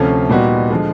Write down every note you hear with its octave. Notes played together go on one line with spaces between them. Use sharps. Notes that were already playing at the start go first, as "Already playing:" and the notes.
Already playing: D2 C3 F3 A3 C#4
A#2 G3 B3 D#4 F#4
D3 F3 G#3